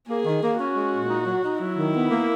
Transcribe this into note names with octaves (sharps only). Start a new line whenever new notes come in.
A#3 G#4
D#3
A#3
C#4 F#4
G#3
A#2
D#4
F#3
D#4
F#3 E4
D#3
B3
A#3